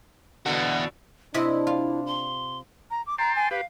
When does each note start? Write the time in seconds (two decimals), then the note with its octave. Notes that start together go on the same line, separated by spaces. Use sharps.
0.46 E2 B2 D3 F#4
1.34 C3 D4 E4 D#5 E5
1.67 F4
2.06 C6
2.90 A#5
3.07 D6
3.18 G5 A5 A#5 C6
3.36 G#5
3.51 G4 B4 F5